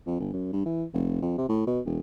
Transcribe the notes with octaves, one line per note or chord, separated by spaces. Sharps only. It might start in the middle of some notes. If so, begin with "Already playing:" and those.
F2
G1
F#2
G2
E3
F1
F2
C3
A2
B2
E1